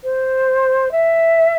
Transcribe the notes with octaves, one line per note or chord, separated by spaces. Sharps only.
C5
E5